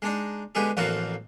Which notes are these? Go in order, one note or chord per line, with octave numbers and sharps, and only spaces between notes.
G#3 D4 D#4
D3 G#3 B3 G4 G#4
A1 F2 A#3 F4 F#4 C5